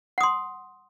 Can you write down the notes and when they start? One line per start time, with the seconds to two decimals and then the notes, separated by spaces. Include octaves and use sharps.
0.18 F#5
0.21 D#6
0.23 C6